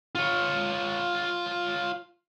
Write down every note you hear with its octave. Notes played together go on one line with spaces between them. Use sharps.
F4 C#5